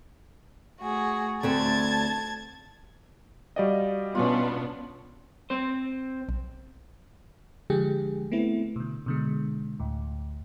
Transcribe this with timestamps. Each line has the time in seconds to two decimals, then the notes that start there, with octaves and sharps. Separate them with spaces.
0.78 A3 F#4 G#4
1.43 D2 A3 C4 A5 G#6 A6
3.56 G3 F#4 D5 D#5 F5 G5
4.15 B2 B3 C#4 D4 F4
5.50 C4 C5
6.29 B1
7.70 D3 F3 G#3 G4 G#4
8.32 A3 B3 C4 E4
8.76 B2 D3
9.06 B2 D3 G#3
9.80 D2 A2